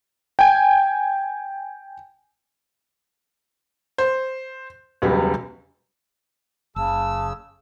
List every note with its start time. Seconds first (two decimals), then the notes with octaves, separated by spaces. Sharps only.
0.39 G5 G#5
3.98 C5
5.02 E1 C#2 F#3 G3
6.76 F#1 C#3 A5 E6